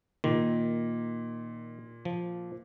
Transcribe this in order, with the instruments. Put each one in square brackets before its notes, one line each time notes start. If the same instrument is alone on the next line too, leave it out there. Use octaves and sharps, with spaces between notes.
[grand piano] A#2 [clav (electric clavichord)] D#3
[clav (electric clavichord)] F3